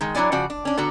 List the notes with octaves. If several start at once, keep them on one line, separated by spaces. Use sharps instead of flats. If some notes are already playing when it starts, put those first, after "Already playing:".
D#3 G#3
F#3 D4 E4 C#5 D5 G#5
C#3 F3 F#4 D5
D4
C#4 D4
D3 B3 F#4 A#5